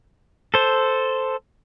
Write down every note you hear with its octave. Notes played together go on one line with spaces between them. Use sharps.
A4 C5